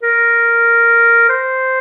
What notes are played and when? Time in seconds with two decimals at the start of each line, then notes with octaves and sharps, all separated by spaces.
0.03 A#4
1.29 C5